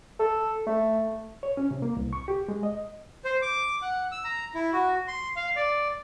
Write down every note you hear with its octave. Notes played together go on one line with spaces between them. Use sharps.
A4
A3
C#5
C#4
C3
A#3
C2
C#6
G4
G#3
D#5
C5
D6
F#5
E6
A#5
E4
F#4
C6
F5
D5